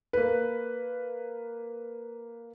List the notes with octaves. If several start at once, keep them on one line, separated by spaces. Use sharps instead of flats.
A#3 B4